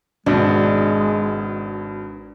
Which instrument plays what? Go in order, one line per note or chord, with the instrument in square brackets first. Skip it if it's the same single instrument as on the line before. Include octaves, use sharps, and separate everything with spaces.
[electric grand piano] G#1 B2 [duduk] G#3 [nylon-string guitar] D4